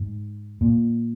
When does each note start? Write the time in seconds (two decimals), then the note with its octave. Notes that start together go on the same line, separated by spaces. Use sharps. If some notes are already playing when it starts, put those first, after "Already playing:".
Already playing: G#2
0.61 A#2